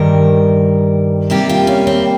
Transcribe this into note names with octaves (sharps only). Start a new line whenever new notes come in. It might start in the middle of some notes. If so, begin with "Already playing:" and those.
Already playing: G2 D#3 G3 A#4
C3 G3 A#3 G4
F4
C#4
C4